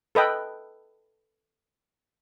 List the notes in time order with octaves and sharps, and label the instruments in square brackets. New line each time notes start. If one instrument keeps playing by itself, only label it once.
[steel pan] A4 B4 D#5 G5